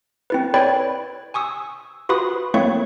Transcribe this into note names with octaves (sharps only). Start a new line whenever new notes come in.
C4 E4 B4
B4 C#5 D5 G5 B5
G#5 C#6 D#6 E6
F4 F#4 B4 B5 D#6
A3 A#3 C4 E4 C#5 C#6